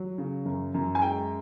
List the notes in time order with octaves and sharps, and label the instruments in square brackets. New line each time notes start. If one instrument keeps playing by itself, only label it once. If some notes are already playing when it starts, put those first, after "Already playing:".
Already playing: [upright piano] F#3
C#3
F#2
F#2
G#5
G#3 G5